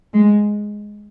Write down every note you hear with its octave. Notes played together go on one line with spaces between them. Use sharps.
G#3